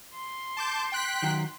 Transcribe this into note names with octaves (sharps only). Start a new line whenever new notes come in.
C6
A5 D6 G6
G5 F#6 B6
D#3 F#3